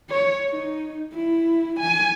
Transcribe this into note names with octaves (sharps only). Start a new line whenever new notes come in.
C#5
D#4
E4
G#5